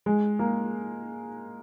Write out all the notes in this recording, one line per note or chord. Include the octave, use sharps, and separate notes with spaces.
G#3
A#3